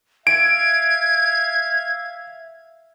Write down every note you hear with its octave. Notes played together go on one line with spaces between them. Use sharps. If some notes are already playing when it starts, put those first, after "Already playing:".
E5 F5 G#6 D7